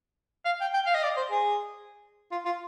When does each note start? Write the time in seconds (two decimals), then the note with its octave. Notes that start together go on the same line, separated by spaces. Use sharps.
0.45 F5
0.61 G5
0.74 G5
0.86 F5
0.95 D#5
1.03 D5
1.17 C5
1.31 G#4
2.31 F4
2.45 F4